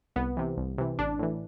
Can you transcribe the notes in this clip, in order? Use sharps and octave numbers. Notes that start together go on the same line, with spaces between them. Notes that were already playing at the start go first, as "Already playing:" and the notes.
C2 B3
C3 E3
C2
C3 E3
A1 D4
A2 E3